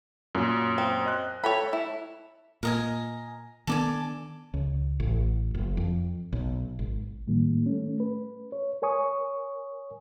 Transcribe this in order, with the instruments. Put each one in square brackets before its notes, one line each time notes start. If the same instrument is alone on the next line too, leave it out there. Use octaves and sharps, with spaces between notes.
[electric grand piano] F#2 A#2
[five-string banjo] C4
[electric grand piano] D#5 F#6
[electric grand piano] A4 [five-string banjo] C#5 G5 B5
[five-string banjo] E4
[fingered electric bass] A#2 [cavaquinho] A#4 D#5 G#5
[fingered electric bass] D#3 B3 D4 [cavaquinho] A4 D5 G#5
[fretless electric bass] C#2
A1
F#1
F2
B1
G#1
[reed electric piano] A2 D#3 G3 A#3
A3 C#4
B4
C#5
A#4 C#5 G#5 C#6 D#6